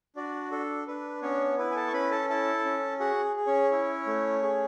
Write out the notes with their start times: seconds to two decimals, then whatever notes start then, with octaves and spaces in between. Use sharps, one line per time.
0.16 D4 F#4 D5
0.52 D4 A4
0.87 D4 B4
1.22 B3 C#4 C#5
1.58 E4 B4
1.71 G#5
1.76 A4 A5
1.88 C#6
1.93 C#4 B4 B5
2.11 A4 A5
2.29 E4 A4 A5
2.65 C#4
3.00 F#4 G#4 F#5
3.36 G#4
3.47 C#4 C#5
3.72 E4
4.06 A3
4.42 G#4